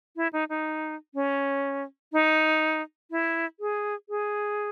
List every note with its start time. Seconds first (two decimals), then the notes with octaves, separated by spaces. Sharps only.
0.16 E4
0.33 D#4
0.49 D#4
1.14 C#4
2.13 D#4
3.11 E4
3.60 G#4
4.09 G#4